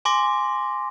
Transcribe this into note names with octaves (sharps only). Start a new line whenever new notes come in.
G#5 C6 D6 A#6